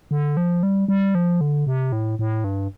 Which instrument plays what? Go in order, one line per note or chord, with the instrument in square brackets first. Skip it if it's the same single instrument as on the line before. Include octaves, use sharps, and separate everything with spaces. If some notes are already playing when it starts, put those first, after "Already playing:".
[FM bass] D3
F3
G3
G3
F3
D3
C3
A2
A2
G2